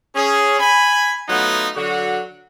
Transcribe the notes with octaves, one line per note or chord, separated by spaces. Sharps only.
C#4 G#4
G#5 B5
F#3 A3 B3 D#4 F4
D3 F#3 F#4